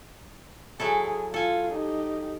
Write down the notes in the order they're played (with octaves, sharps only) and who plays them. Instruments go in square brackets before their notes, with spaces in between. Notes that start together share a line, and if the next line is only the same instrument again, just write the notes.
[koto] F#3 E4 A4 [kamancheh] G#4 G#5
[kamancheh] F4 [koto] A4 G#5
[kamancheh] D#4 G4